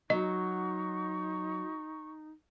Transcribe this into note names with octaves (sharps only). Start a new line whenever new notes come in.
F#3 D#4 D#5 C#6